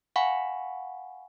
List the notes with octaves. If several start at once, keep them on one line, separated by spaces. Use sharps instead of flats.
F5 F#5 G#5 B5 C#6